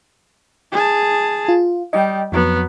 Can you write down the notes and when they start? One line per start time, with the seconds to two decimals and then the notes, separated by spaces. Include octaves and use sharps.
0.72 G#4 A5
1.48 F4
1.93 G3 D#5 G5
2.32 F2 F#3 B3